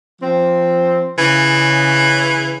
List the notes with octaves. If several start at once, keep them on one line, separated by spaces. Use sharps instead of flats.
F3 C4
C#3 E3